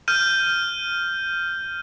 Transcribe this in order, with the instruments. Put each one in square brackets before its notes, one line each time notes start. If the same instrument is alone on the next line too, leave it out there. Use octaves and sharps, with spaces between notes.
[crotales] F6 G6 D#7